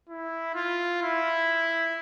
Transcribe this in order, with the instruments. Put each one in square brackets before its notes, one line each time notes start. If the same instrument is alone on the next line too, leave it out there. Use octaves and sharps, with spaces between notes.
[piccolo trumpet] E4
F4
E4